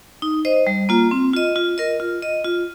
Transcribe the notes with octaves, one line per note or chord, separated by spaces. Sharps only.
D#4
C5 D#5
G3
A#3 F4
C4
F4 D#5
F4
A#4 D#5
F4
D#5
F4